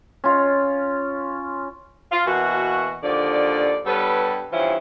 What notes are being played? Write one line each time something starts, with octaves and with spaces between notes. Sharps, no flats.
C#4 F4
F4
B2 E3 A#3 F#4
D#2 D3 F3 D5
G2 G3 B3 A4 B4 C#5
G2 E3 F3 C#4 E4 C5